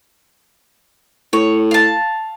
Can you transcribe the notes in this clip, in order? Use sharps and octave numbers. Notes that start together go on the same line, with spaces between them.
A2 C#5
F5 A5